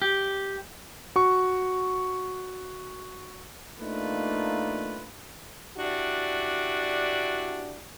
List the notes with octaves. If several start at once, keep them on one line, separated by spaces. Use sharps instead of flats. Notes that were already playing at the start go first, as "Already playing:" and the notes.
G4
F#4 C#6
A3 A#3 D4 D#4 F4 B4
D4 E4 F#4 G4 D5